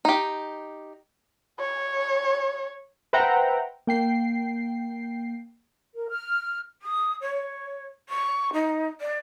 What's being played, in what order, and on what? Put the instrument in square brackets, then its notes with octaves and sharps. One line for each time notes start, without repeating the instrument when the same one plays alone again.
[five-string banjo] D#4 G4
[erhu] C#5
[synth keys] B4 C5 E5 F#5 G5 A#5
A#3 G5 C7
[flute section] A#4
F6
[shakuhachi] D#6
C#5
C#6
D#4
D5